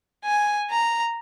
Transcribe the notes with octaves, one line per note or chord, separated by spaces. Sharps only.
G#5
A#5